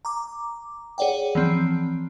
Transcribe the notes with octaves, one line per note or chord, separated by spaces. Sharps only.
A#5 D6
G#4 C#5 D5 F#5 G5
E3 F3 C4